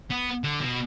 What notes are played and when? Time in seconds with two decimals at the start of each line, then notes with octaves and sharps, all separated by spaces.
0.10 B3
0.44 D3
0.61 B2